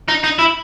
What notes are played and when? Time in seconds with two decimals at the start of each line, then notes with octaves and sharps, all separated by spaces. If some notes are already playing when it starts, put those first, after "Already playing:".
0.08 D#4
0.24 D#4
0.39 E4